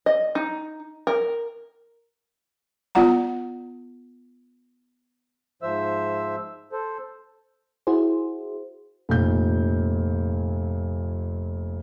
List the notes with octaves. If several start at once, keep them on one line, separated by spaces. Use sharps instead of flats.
D#5
D#4
A#4
B3 F4 D5 F#5 A#5
G#2 F3 C5 E5 E6
A4 C5
E4 F#4 G#4 C5
F1 A#2 G6